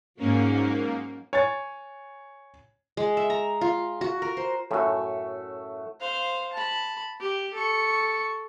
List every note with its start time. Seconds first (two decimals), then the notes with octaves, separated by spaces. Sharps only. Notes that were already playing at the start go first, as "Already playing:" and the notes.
0.19 G#2 F#3 A#3 C#4
1.33 C#5 G#5 A6
2.97 G#3
3.17 E5
3.30 A#5
3.61 F4
4.01 F#4
4.22 A#4
4.37 C5
4.71 F#2 A2 A3 F#4
6.00 C5 F5
6.52 A5 B5
7.19 G4
7.53 A4 C#6